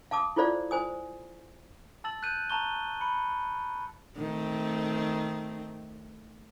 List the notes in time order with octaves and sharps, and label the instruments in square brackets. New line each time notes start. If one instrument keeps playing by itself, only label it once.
[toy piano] F5 A5 D6 D#6
E4 F4 A4 C5 D5 F5
C5 G#5 D#6
[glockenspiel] A5 E6 A6 F#7
F#6 G6 D#7
A5 A#5 C#6 G7
B5 C#7
[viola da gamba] D#3 A3 C4